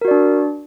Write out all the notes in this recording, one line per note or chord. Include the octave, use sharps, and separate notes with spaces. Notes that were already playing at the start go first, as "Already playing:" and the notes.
D4 F#4 A#4 D5